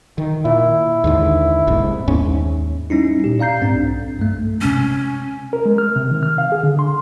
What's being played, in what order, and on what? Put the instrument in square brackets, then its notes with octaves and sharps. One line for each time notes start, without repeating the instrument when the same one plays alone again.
[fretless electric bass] D#3
[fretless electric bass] A#2 [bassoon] E4
[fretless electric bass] D#2 G#2 D3
F#1 C2 G#2
D#2 G#2 C#4
[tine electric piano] G3 C#4 D#4 E4
A#2 G4
D5 F5 A#5 G6 C7
G#2 C4 D4
B1
G2 A3
[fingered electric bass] C3 G#3 [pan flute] C#4
[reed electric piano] A#4
G#3
F6
C3
D#3
F6
F5
G#4
D3
C6